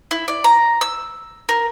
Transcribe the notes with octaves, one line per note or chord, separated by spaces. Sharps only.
E4
D5
A#5
E6
A#4